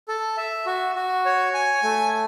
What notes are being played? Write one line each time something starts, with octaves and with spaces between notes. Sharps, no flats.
A4
E5
F#4
F#4
C#5
G#5
A3